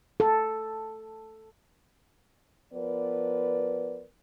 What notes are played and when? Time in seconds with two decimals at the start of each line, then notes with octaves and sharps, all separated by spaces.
0.20 A4
2.73 F3 B3 A#4 B4 D5